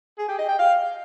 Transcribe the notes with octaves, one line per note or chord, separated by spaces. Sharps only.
G#4
G4
D#5
G5
F5